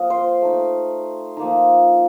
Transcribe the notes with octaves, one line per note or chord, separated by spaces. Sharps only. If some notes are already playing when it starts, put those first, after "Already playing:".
Already playing: F3 A#3 F4 D#5
C5
A3 D#4
F3 A#3 D#4